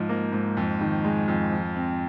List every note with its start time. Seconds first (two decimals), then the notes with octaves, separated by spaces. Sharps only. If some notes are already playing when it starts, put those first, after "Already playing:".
Already playing: G#2 F3
0.09 A#3
0.32 G#2
0.57 F2
0.81 D#3
1.04 G#3
1.28 F2
1.52 F3
1.76 C4